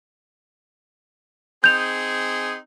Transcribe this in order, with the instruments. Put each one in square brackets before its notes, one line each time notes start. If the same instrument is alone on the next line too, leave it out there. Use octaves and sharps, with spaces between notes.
[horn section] C4 D#4 G#4 [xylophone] G6 F7